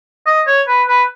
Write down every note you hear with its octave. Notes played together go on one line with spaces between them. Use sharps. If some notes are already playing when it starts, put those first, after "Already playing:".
D#5
C#5
B4
B4